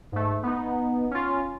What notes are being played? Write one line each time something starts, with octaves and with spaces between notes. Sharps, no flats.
G#2 A3
B3 D#4
C#4 F4